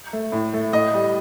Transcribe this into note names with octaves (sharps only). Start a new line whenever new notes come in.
A3
A2
A3
A2 D#5
G3